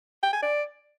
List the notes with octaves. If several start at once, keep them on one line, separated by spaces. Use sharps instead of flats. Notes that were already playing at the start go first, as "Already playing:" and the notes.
G5
G#5
D5